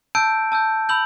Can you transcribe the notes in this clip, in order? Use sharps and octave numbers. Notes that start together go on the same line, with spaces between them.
A5 E6 G6 D7
A5 E6 G6
B5 E6 G6 F#7